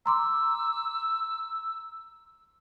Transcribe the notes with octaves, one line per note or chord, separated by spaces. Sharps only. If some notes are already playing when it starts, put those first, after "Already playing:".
A#5 C6 D6 E6